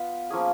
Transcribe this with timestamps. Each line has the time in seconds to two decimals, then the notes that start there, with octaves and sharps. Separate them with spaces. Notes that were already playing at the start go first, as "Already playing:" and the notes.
Already playing: B3 F4 B4
0.30 F3 A#3 C#4 G#4